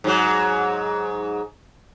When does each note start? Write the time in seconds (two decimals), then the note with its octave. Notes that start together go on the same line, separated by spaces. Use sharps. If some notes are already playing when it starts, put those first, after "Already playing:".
0.04 G#2 F#3